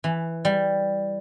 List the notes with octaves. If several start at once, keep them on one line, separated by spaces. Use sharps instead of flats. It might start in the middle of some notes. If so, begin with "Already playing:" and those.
E3
G3